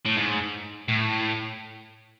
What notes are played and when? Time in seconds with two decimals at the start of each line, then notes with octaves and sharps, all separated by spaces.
0.06 A2
0.17 G#2
0.89 A2